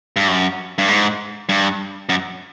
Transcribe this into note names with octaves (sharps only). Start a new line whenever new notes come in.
G2
F#2
G2
G#2
G2
F#2